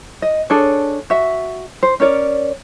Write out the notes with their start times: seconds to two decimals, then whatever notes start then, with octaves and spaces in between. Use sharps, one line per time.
0.22 D#5
0.50 D4 G#4 A4 C#5
1.10 F#4 E5
1.83 C5
2.00 C#4 A#4 C#5 D5